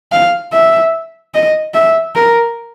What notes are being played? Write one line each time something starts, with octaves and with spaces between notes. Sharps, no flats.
F5
E5
D#5
E5
A#4